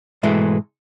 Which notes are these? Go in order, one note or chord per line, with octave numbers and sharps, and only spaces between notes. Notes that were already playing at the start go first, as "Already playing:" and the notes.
G#2 B2 E3 G#3 A3